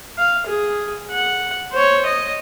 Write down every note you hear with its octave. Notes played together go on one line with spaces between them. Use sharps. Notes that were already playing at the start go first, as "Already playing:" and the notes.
F5
G#4
F#5
C5 C#5
D#5